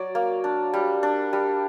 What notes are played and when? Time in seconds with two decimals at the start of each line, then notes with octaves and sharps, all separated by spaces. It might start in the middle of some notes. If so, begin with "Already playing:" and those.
Already playing: F#3 D5
0.15 A#3
0.44 D4
0.74 G3
1.03 D4
1.33 G3